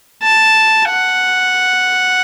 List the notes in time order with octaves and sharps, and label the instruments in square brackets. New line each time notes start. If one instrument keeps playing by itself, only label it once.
[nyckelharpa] A5
F#5